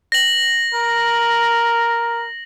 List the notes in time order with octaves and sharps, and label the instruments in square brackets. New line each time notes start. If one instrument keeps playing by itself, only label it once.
[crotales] A#6 F#7
[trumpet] A#4